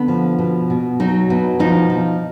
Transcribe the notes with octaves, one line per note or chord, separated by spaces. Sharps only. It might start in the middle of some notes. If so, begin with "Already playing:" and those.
Already playing: D3 B3
F3
B2
B2
F#3 D#4
B2
F3 D#4
F3